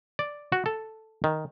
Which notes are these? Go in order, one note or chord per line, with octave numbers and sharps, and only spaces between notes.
D5
F#4
A4
D#3